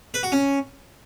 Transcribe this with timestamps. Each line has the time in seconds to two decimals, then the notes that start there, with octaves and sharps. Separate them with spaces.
0.14 B4
0.23 F#4
0.32 C#4